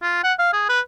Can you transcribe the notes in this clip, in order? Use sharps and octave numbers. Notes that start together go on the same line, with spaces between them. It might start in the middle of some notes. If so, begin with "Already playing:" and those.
F4
F#5
F5
G#4
B4